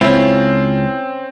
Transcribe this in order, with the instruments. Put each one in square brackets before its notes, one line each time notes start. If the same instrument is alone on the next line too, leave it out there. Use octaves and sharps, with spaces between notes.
[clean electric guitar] C#2 F4 [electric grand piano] C4 [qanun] C#4 A5 [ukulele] E4